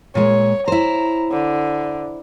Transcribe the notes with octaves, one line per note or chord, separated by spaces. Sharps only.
A#2 G#3 C#5
E4 C5 A#5
D3